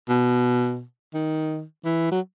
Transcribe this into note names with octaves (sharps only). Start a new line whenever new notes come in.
B2
D#3
E3
F#3